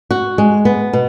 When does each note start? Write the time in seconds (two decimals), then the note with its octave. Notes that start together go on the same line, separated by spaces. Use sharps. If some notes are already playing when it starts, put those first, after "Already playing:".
0.11 F#4
0.38 G#3
0.65 B3
0.93 B2